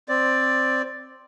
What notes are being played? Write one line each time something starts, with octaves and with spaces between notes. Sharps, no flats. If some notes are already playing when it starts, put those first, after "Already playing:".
C4 D5